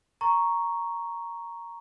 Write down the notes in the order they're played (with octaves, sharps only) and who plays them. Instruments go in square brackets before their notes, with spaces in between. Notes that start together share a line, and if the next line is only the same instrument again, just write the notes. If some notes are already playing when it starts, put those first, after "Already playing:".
[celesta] A#5 C#6